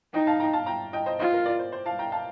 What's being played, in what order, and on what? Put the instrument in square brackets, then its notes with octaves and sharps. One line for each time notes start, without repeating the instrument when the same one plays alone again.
[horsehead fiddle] D#4 [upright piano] D#5 G5
[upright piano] F5 A5
G5 A#5
F5 A5
G5 A#5
D#5 G5
C5 D#5
[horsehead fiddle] F4 [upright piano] C5 D#5
[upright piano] A#4
A#4 D5
C5
C5
F5 A5
G5 A#5
F5 A5